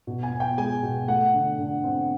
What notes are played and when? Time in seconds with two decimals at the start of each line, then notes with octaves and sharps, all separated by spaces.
0.07 B2
0.23 G#5
0.31 B3
0.40 G5
0.58 G#3 G#5
0.83 B2
1.08 A3 F#5
1.34 D3
1.59 D3
1.84 C4